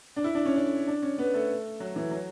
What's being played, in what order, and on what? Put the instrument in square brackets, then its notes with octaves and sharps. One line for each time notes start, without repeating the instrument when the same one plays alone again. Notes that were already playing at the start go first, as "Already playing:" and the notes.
[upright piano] D4
E4
D4
C#4
D4
D4
C#4
B3
A3
F#3
E3
F#3